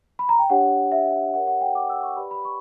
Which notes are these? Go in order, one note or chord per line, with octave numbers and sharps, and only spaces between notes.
B5
A#5
G5
D4 G4 C#5 F#5
E5
G4 A#4 C#5 F#5
F#5
G5
D6
E6
C#6
G4 B4 D5 B5
B5
C#6